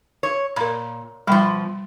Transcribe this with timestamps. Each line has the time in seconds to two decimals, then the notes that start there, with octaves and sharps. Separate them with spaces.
0.23 C#5
0.56 A#2 A#4 B5
1.27 B2 F3 G3 G5